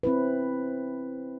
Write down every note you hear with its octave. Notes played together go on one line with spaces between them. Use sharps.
C4 E4 B4